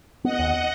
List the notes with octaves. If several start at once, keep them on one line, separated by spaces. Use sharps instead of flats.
B3 D#5 F#5
D#2